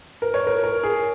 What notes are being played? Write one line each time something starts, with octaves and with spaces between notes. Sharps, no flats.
A#4
C#5
A#4
A#4
G#4